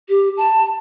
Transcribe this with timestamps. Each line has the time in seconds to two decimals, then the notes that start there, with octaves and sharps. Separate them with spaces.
0.09 G4
0.37 A5